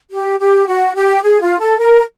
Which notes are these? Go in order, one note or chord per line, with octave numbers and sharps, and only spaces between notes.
G4
G4
F#4
G4
G#4
F4
A4
A#4